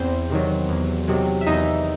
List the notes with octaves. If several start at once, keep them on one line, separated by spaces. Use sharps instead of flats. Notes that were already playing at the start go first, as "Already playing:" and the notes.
Already playing: E2 C4 C5
C3 D#3 F#3
E2
C3 D#3 F#3
E5
E2 D#4 D#5